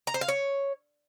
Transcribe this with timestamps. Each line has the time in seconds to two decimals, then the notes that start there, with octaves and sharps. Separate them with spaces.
0.07 A#5
0.14 C5
0.21 F5
0.28 C#5